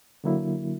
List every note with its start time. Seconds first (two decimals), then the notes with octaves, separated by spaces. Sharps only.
0.24 D3 F#3 A#3 E4